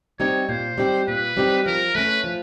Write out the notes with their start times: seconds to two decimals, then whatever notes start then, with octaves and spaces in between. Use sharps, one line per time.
0.20 G3 C4 D#4 G4 C#5
0.49 A#2 C5
0.78 G3 C4 D#4 G4
1.08 A#2 B4
1.37 G3 C4 D#4 G4
1.66 F3 A#4
1.95 A3 C#4 B4
2.24 F3